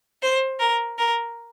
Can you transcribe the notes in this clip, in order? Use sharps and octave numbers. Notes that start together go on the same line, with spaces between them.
C5
A#4
A#4